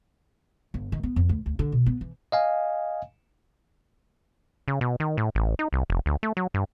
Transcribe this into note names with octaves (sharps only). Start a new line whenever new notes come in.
G1
D#3
B3
F2
D2
D2
D3
B2
B3
E3
D#5 F5 G#5
C#3
B2
D#3
A2
A1
D#4
C2
F1
D2
A3
F#3
G2